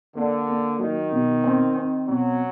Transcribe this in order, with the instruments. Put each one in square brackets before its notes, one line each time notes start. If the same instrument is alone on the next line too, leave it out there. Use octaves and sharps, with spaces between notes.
[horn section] D3 [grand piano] A#3
[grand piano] A#3
[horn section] D#3 [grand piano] F#3
[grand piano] B2
C4
C4
[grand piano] B2 [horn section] F#3